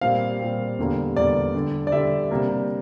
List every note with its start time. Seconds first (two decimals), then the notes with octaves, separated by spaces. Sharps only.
0.01 A#2 G3 C4 F5
0.40 A#2 G3 C4
0.79 E2 D3 G3 A#3
1.16 E2 D3 G3 A#3 D5
1.54 D3 G3 D4
1.87 D5
1.92 D3 G3 D4 E5
2.30 C3 G3 A#3 D4